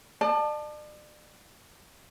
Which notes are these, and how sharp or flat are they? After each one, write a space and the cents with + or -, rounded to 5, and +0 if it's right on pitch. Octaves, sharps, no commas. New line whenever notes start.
D5 +40 A5 +0